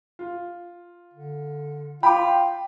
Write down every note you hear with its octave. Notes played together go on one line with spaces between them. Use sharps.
F4
D3
F4 G5 B5 D6